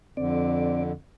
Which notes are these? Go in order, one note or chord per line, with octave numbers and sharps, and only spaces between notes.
F2 D3 C4 D5